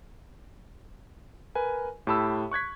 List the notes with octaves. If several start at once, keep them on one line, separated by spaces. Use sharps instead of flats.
A#4 B4 G#5
A2 G4 A5 B5 E6
C#6 F#6 G#6 B6